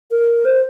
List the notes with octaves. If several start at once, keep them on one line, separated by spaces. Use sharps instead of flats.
A#4
C5